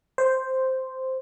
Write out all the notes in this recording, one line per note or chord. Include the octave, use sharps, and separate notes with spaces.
C5